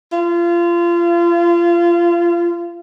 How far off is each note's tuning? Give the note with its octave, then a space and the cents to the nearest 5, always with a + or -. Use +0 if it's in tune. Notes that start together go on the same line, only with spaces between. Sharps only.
F4 -25